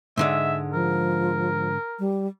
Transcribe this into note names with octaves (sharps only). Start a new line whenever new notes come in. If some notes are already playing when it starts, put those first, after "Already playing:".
G#2 D3 G#3 E5
F3 A#4
G3